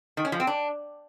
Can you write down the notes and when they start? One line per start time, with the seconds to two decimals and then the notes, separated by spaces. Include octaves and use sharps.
0.17 D#3
0.25 C#4
0.32 F3
0.40 C4
0.47 D4